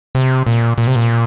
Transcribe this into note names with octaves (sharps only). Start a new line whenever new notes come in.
C3
A#2
A#2
C3
A#2